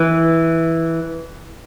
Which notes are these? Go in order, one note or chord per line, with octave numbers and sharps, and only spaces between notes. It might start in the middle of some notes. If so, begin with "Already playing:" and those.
Already playing: E3